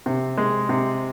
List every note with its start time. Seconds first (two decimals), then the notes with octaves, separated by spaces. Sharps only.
0.06 C3
0.37 G#3
0.69 C3